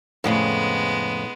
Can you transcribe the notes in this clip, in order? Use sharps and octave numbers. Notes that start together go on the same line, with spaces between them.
F2 A2 C#3 G#3 B3